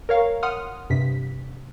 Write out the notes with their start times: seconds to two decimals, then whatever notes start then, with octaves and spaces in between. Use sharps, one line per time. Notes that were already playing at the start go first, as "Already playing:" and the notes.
0.09 A#4 C#5 F5
0.43 F#5 C6 D#6 F6
0.90 G2 C3 B6